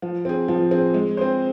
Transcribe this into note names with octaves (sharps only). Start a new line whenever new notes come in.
F3
C4 G#4
F3
C4 G#4
G#3
C4 G#4 C5